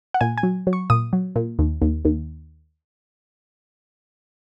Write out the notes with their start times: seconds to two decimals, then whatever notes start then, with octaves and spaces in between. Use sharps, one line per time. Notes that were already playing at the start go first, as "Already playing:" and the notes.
0.14 F#5
0.21 A#2 G#5
0.38 G#5
0.43 F#3
0.67 F#3
0.73 C#6
0.90 A#2 D#6
1.13 F#3
1.36 A#2
1.59 D#2
1.82 D#2
2.05 D#2